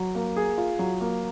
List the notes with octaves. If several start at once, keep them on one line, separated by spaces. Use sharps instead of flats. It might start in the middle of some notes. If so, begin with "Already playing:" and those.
Already playing: F#3
A#3
G#4
F4
F#3
A#3